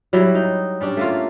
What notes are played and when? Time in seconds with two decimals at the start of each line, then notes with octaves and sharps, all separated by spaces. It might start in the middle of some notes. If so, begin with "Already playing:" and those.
0.13 F#3 G3 E4
0.35 D#4
0.81 G3 C#4 D4
0.97 A3 A#3 F4